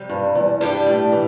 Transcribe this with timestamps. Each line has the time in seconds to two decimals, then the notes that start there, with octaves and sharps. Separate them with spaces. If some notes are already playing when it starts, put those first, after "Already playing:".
Already playing: C3 G3
0.09 G2
0.35 E2
0.60 G2 G3 D4 G4
0.86 A2
1.12 E3